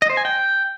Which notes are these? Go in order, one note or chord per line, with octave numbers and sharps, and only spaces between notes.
D#5
C5
G#5
G5